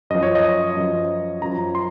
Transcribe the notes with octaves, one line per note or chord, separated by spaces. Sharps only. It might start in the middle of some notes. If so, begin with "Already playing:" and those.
F#2 F3 D#5
C#5
D#5
F#2 F3
F#2 F3 A#5
C6